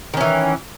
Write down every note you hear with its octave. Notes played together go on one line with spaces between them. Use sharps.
D#3 E3 C#4